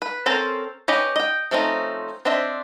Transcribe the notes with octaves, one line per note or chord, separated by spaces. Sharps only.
B4
C4 C#4 A4 A#4 C5
C#4 G4 B4 D#5
D#5 G5
F3 A3 C4 C#4 D#4
C4 D4 C5 D#5 E5